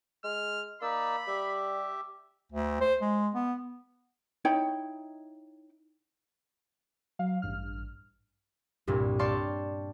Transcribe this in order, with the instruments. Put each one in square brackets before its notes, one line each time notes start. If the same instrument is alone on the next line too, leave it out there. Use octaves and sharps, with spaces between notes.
[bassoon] G#3 [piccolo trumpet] F6
[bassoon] A#3 [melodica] D#4 D5 E6 [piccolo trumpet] B5
[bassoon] G3 [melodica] G4 E5
[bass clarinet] D2
C5
G#3
B3
[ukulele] D#4 E4 C#5 G5
[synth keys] F#3 F5
A1 G2 F6
[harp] C2 G2 A#2
D5 F5 G5 A5 C6 C#6